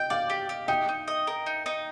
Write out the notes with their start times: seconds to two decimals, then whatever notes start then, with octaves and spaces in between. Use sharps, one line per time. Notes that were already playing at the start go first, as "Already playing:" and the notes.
Already playing: D#5 G5
0.10 D5 F5
0.30 G4
0.49 G4
0.68 D#4 G5
0.89 D#4
1.08 D#5
1.27 A#4
1.46 D#4
1.66 D#4